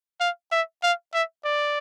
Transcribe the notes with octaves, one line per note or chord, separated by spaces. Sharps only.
F5
E5
F5
E5
D5